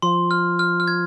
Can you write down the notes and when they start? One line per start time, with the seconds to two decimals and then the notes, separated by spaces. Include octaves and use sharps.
0.02 F3 C6
0.31 F6
0.59 F6
0.80 F6
0.88 G#6